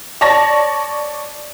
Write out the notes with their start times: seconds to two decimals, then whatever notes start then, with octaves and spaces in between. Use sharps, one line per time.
0.21 C#5 D5 A5 C#6 A#6